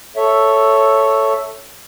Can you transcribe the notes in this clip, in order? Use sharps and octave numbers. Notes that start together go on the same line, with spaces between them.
A4 C#5 E5